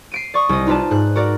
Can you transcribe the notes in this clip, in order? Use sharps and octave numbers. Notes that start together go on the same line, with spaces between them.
C7 D7 D#7
D5 C#6 D#6
C2 D#5
D#4 F4 B4 D5 A5
G#2 F#6
F#4 A#4 D5